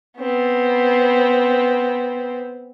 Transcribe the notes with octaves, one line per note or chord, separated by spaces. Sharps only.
B3 C4